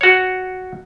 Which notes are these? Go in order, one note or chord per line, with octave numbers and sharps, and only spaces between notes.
F#4 C#5